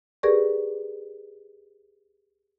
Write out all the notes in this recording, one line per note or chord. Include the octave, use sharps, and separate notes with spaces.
G4 G#4 A#4 B4 D5 C#6